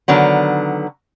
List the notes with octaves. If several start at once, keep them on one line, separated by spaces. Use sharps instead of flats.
D3 D#3 F#3 B3